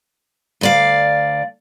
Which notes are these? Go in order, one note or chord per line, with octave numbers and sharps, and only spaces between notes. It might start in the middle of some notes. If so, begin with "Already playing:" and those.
D2 D5 F5